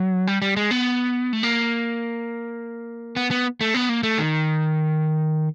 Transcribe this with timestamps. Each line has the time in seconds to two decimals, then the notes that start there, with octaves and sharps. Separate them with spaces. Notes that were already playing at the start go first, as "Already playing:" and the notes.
Already playing: F#3
0.27 G3
0.42 G3
0.57 G#3
0.71 B3
1.33 A3
1.43 A#3
3.16 B3
3.31 B3
3.61 A3
3.74 B3
3.89 A#3
4.03 A3
4.18 D#3